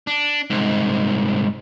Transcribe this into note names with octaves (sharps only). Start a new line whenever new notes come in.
D4
C2 G#2